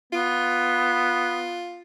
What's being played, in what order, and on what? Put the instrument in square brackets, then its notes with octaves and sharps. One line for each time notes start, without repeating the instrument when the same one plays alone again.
[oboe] B3 [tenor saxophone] F4